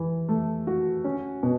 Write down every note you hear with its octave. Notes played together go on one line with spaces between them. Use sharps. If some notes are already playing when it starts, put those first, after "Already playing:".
Already playing: E3
A3
F#4
C#4
B2